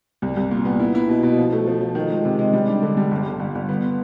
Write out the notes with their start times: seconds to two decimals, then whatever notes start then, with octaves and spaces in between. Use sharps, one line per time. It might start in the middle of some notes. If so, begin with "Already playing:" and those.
0.22 C2
0.36 C2
0.51 A#2
0.65 B3
0.79 E4
0.95 E4
1.09 B2
1.23 B2
1.38 F3
1.53 A3
1.67 F3
1.81 F3
1.95 D#3
2.10 G#3
2.25 C3
2.39 G#3
2.53 G3
2.68 D4
2.83 D3
2.97 G3
3.11 G1
3.26 G1
3.40 G1
3.55 G1
3.69 B3